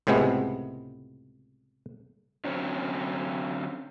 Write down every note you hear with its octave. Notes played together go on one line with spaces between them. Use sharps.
C#2 A2 C3 G#3 B3
D3 F#3 C4 C#4